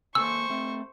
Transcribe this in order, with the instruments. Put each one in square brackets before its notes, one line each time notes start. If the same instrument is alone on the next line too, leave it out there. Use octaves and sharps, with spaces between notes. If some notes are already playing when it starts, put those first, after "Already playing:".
[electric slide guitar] A#3 A4 G#5 [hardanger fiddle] C5 C#6 [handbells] E6
[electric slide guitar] A3 C4